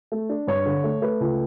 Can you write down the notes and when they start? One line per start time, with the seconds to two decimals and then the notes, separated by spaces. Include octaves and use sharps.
0.12 A3
0.29 D4
0.47 G2 C#5
0.65 D3
0.84 A3
1.02 A3 B4
1.20 C#2